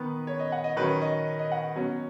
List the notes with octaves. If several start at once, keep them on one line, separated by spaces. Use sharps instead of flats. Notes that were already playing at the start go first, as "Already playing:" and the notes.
Already playing: D#3 B3 B4
C#5
D#5
F#5
D#5
D#3 F#3 C#4 B4
D#5
D#5
F#5
B2 F#3 C#4